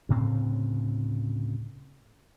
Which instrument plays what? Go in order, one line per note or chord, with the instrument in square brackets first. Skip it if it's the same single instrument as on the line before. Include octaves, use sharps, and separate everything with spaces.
[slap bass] D2 A2 C#3 C4